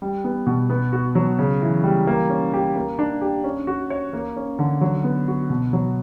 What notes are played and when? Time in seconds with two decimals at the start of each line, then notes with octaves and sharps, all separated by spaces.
0.02 G3
0.24 B3
0.47 B2
0.70 B3
0.93 F#4
1.15 F#3
1.39 C#3
1.62 E3
1.84 G3
2.07 A#3
2.29 C#4
2.53 G4
2.76 A#3
2.99 D4
3.21 G4
3.44 C#4
3.67 F#4
3.90 C#5
4.13 A#3
4.36 C#4
4.59 D3
4.81 F#3
5.04 B3
5.28 F#4
5.50 B2
5.73 F#3